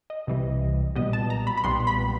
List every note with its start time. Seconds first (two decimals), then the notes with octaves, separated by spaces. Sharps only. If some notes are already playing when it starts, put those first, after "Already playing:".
0.10 D#5
0.27 C2 C3 E3 G3
0.95 B1 A#2 G3 B3 D#5
1.13 A5
1.30 A#5
1.47 B5
1.57 B5
1.64 B1 A#2 G3 B3 C6
1.87 B5